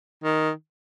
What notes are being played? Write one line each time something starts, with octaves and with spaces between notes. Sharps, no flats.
D#3